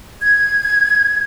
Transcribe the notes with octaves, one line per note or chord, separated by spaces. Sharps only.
G#6